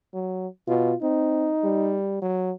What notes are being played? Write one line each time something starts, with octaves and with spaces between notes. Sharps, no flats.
F#3
B2 F4
C4 D#4
G3
F#3